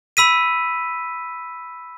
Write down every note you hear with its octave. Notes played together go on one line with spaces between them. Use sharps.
B5 E6 B6 D#7